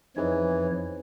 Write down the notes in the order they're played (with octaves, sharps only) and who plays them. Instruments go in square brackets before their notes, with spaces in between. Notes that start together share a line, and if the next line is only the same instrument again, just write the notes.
[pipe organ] F2 F3 C#5 [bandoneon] E3 [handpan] D#4 G#4 B4